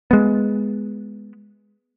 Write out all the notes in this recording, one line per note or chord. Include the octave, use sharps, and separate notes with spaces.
G#3 B3